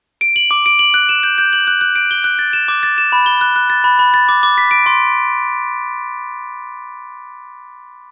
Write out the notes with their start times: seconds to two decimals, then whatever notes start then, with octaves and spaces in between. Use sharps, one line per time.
0.21 D7
0.36 F#7
0.51 D6
0.66 D7
0.79 F#7
0.94 F#6
1.09 E7
1.23 G6
1.38 G6
1.53 F#7
1.67 F#6
1.81 F#6
1.95 D7
2.11 G7
2.24 F#6
2.39 A6
2.53 E7
2.68 D6
2.83 A6
2.98 E7
3.12 B5
3.26 G7
3.41 F#6
3.56 F#6
3.70 A6
3.84 B5
3.99 B5
4.14 A6
4.29 D6
4.43 D6
4.58 B6
4.71 D7
4.86 C6